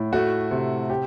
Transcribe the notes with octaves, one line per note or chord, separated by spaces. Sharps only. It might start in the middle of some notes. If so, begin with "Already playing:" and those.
Already playing: A2
A3 F#4
C3
G4